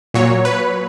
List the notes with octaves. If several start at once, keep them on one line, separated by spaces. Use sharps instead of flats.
A#2 F#3 C#5
B4